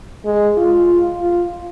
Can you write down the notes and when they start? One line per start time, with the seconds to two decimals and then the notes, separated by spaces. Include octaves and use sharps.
0.26 G#3
0.57 F4
1.21 F4